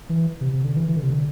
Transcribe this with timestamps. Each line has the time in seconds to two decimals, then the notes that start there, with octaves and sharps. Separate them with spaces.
0.09 E3
0.41 C3
0.53 C3
0.65 D3
0.76 E3
0.88 E3
0.96 D3
1.03 C3
1.10 D3